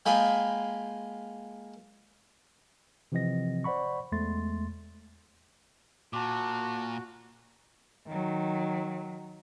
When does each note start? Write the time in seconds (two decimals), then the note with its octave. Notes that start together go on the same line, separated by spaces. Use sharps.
0.06 G#3 A#3 F4 G5 G#5 B5
3.12 C3 E3 F3 C4 D#5 A#6
3.64 C5 D5 F#5 B5 C#6
4.12 E2 G#3 A3 C6 A6
6.13 A#2 F#4 A5 D6
8.08 D#3 F#3